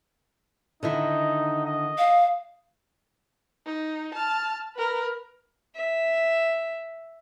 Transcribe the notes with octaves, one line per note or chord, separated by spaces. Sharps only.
D3 D#3 D#4 E4
D#5
F5
D#4
A5 F6
A#4 B4
E5